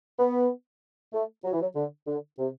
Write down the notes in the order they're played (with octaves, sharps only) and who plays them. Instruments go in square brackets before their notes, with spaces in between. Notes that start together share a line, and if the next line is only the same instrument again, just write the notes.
[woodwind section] B3
A3
F#3
E3
F#3
D3
D3
C3